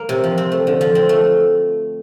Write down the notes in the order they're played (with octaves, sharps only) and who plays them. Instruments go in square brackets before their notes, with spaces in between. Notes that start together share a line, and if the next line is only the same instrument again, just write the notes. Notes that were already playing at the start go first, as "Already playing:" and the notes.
Already playing: [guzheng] A#3
C3
F3
C4
A3
D3
F3
C4
A3